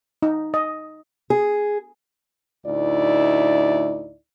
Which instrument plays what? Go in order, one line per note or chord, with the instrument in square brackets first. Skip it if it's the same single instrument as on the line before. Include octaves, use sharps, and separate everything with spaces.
[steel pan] D#4
D#5
[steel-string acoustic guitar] G#4
[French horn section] D2 A2 D#4 E4 D5